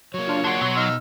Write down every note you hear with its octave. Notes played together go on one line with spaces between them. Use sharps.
F#3 A#3 C#5
D4 F4
D4 F#5 C6
B2 F#3
D#4 E6 F6